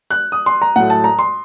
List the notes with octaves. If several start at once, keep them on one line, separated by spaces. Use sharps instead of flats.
F#6
D#6
C6
A#5
A2 F#3 A3 F#5
A5
A#5
C6